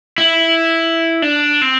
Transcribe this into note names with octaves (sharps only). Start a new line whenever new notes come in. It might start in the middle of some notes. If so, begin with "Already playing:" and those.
E4
D4
C4